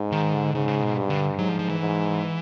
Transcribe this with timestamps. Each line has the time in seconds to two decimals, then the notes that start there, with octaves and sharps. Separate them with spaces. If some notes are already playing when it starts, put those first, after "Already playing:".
Already playing: G#2
0.12 D#3
0.33 D3
0.54 G#2 C#3
0.68 C#3
0.81 B2
0.96 G2
1.09 D3
1.38 G#2 F#3
1.48 F3
1.59 F3
1.69 E3
1.80 G#2